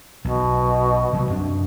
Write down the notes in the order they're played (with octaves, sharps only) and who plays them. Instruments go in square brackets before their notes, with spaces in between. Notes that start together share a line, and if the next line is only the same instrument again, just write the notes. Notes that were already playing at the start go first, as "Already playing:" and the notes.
[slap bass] B1 [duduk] B2
[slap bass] C3 F#3 G3
F#2 C4 D4